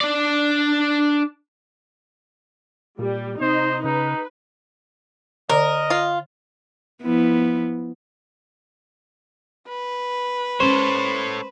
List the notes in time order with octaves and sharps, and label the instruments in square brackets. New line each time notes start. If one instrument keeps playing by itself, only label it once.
[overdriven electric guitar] D4 D5
[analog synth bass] A#2 [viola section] G3
[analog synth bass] C3 [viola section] D#4 D#5 [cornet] C5
[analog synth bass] C#3 [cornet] D#4 [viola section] B4
[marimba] D3 D5 [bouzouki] A#4 [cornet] D#5
[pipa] F4
[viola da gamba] F3 B3 E4
[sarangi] B4
[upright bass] G#3 C#4 [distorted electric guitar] A4 C#5 [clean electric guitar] C5